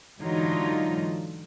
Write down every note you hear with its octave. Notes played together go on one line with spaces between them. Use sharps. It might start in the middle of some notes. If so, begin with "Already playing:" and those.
G#2 D3 E3 F#3 D#4 F4